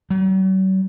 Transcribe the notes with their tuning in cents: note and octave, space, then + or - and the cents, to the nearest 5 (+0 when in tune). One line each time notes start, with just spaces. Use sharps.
F#3 +45